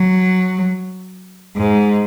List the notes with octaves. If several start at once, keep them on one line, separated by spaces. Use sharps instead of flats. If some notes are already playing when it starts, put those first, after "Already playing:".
Already playing: F#3
G#2